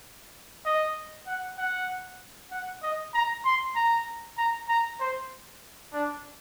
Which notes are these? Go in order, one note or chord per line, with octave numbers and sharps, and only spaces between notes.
D#5
F#5
F#5
F#5
D#5
A#5
C6
A#5
A#5
A#5
C5
D4